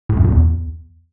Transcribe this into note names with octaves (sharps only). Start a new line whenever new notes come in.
A2
F#2
A#2
E2